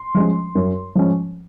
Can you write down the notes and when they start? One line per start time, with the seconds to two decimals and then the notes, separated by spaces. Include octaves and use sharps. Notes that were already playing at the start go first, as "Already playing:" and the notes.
Already playing: C6
0.15 F3 G#3 C#4
0.55 F#2
0.95 F3 G#3 C#4